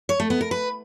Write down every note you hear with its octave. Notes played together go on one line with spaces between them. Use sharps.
C#5
A3
B3
A#4
B4